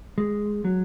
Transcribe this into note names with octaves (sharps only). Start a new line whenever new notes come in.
G#3
F#3